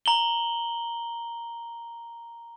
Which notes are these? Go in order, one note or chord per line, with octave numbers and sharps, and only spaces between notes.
A#5 F#7 G7